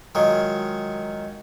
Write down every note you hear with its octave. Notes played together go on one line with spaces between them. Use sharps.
D#3 F#3 G#3 F4 G#4